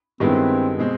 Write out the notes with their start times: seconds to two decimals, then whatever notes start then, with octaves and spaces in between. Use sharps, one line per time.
0.20 G2 D#3 G#3 B3 C4 E4
0.78 B2 G#3 C4